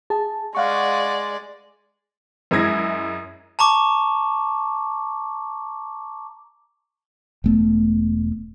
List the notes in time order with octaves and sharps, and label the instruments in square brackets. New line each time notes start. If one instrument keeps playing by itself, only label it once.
[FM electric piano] G#4 A5
[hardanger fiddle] G#3 D5 [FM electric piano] F5 F#5 C#6
[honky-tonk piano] F#2 G#3 E4 G#6 A#6
[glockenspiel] A5 A#5 C#6 D6
[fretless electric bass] E1 A3 B3